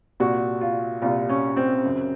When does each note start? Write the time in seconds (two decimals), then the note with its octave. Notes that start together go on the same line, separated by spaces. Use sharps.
0.20 C2 A#2 F#4
0.61 F4
1.02 C2 A#2 F4
1.29 C#4
1.56 C4
1.83 F#2 C#3